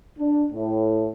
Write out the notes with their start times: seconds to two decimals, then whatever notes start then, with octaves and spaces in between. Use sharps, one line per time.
0.17 D4
0.52 A2